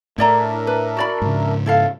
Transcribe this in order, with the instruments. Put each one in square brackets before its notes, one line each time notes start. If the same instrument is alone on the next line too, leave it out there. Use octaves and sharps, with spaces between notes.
[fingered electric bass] A2 [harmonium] D4 A#4 E5 [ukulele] E4 D5 A#5
[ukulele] B4
F#4 D5 B5
[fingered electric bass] G#2 C#3
[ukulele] E4 A4 F5